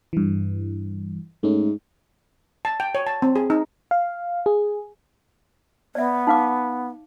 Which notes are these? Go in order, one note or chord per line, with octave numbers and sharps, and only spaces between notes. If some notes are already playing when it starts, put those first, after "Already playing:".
G2 E3
G#2 A3 C#4
A5
G5
C#5
A5
C4
G#4
D#4
F5
G#4
B3 D5 E5
D#4 F5 D6